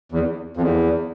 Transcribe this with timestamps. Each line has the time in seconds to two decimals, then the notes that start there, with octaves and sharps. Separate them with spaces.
0.12 E2
0.57 F2
0.61 E2